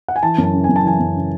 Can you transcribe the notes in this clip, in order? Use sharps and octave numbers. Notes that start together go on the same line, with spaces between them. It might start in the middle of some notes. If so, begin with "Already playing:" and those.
F#5
G#5
E3 A5
F#2
A5
C#3
F#2 G#5
A5
E3 G#5
F#2
C#3